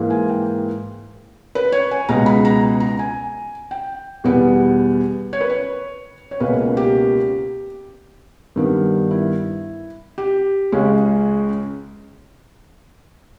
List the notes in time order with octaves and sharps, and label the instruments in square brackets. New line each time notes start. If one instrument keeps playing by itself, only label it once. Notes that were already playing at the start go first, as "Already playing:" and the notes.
Already playing: [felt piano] G#2 E3 A#3
G#5
G5
B4
C#5
G#5
C#2 B2 G#3 A#5
B5
A#5
A#5
G#5
G5
E2 B2 G3 B3
C#5
B4
C#5
C#5
C#2 B2 A#3 C#4 B4
G4
G2 D#3 G3 B3
E4
G4
C#2 C#3 G#3 C#4